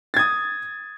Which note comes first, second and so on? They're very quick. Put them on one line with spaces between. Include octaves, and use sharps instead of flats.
A6 G#6 D#6